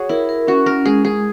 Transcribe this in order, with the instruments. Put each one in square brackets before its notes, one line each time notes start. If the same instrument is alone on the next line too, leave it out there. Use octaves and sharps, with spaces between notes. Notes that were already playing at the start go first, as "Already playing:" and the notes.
Already playing: [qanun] F#4 G#4 [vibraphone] C#5
[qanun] E4 [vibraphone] A#4
[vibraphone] A#4
[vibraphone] C#4 [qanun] F#4
[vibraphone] C#4 [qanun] A#4
[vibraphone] G#3 [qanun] G#4
[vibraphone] G#3 [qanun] G#4